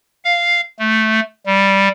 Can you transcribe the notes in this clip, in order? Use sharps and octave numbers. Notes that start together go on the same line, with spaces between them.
F5
A3
G3